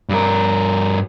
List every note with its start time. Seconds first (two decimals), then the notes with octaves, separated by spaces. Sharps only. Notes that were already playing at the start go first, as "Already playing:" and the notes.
0.09 G2 A#4